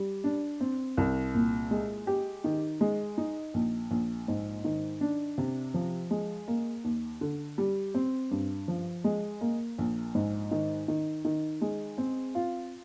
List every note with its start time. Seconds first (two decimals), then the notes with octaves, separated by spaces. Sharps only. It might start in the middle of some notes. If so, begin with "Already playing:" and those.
Already playing: G3
0.24 D4
0.60 C4
0.97 C2
1.35 A#2
1.71 G#3
2.07 G4
2.44 D#3
2.81 G#3
3.18 D#4
3.54 A#1
3.91 A#1
4.28 G#2
4.65 D#3
5.01 D4
5.38 C3
5.74 F3
6.11 G#3
6.48 A#3
6.84 D#2
7.21 D3
7.58 G3
7.94 C4
8.31 G2
8.68 F3
9.04 G#3
9.41 A#3
9.78 A#1
10.15 G#2
10.51 D#3
10.88 D#3
11.25 D#3
11.61 G#3
11.98 C4
12.35 F4